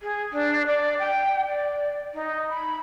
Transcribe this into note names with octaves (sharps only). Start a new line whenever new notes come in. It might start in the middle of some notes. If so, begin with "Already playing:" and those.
G#4
D4
D5
G5
D5
D#4
B5